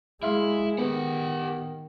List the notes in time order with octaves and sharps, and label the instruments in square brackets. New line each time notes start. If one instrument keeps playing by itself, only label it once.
[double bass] G#3 [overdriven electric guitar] E4 [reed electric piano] E5 F5 C6
[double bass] D#3 [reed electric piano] B3 [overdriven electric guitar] G4 F#5